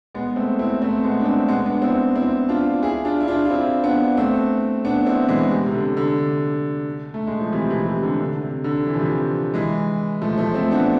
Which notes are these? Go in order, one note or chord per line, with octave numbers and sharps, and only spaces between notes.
G#3 B3
A3 C4
C4 E4
A3 C4
G#3 B3
D4
A3 C4
G#3 B3
B3 D4
C4 E4
C4 E4
D4 F4
E4 G#4
D4 F4
E4
D4 F4
F4
C4 E4
B3 D4
A3 C4
B3 D4
C4 E4
E3 G#3
C3
C3
D3
D3
A3
G#3
F3
C3 E3
C3 E3
C3
D3
D3
C3
D3
E3
F3
C3 E3
E3 G#3
F3 A3
F3 A3
A3 C4
B3 D4